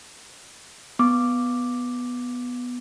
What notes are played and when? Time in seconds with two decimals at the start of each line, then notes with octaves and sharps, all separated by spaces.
0.99 B3 D6